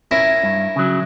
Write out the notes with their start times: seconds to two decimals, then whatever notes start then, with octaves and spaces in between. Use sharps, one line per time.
0.11 C#4 E4 A#4
0.43 G2
0.76 C#3 F#3